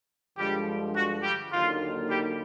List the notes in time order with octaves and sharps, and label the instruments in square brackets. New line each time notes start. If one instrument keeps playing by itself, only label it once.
[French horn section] G2 D3 F3 G#3 [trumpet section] G3 G4
[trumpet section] F#4
G3 G4
[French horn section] D#2 D3 F#3 A#3 D#4 [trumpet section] F4
[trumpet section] G3 G4